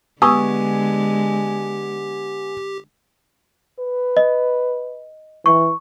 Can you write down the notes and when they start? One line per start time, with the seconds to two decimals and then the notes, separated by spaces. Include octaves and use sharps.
0.22 D3 G#3 B3 G4 G#5 C#6 D#6 E6
3.79 B4
4.17 D#5
5.46 E3 C#6